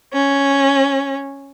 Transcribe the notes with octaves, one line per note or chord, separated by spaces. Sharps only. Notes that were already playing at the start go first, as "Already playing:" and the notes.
C#4